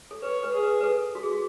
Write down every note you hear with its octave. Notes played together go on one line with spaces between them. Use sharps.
A4
B4 C#5
B4
G#4
B4
B4
A4
F#4
G#4
F#4